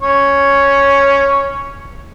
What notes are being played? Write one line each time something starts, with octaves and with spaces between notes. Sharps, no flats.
C#4 C#5